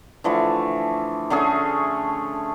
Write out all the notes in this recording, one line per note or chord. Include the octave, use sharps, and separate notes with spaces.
D3 E3 F3 A3
D3 A3 C#4 G#4